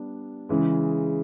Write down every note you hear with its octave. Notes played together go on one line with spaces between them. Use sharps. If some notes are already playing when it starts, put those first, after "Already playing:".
Already playing: G3 B3 D4
C#3 E3 G#3